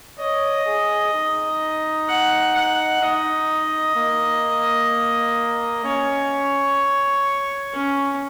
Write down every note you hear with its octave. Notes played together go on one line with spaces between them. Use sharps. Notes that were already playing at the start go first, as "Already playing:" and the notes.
C#5 D#5
G#4
D#4
F#5
F#5
D#4 D#5
A#3
C#4 C#5
C#4